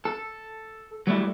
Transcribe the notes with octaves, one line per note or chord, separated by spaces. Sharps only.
A4
F#3 G3 A3 E4